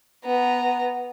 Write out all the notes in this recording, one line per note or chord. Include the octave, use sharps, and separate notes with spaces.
B3 A#5